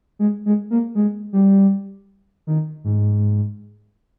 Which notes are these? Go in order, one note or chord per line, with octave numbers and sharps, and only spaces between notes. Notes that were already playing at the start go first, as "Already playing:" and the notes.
G#3
G#3
A#3
G#3
G3
D#3
G#2